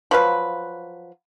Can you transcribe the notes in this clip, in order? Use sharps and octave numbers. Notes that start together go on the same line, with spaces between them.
F3 F#3 B4 F5